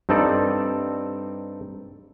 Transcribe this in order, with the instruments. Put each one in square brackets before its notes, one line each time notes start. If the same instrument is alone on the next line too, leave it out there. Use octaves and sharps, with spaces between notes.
[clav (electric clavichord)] G2 C4 D#4 A4 D5